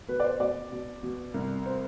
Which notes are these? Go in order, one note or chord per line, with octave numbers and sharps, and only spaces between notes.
B2 B4
D5
C5
B2 D5
B2
B2
C2
C5